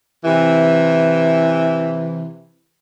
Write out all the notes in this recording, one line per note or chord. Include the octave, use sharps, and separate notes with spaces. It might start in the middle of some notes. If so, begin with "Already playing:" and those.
C3 E3